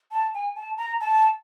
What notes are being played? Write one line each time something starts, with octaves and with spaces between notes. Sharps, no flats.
A5
G#5
A5
A#5
A5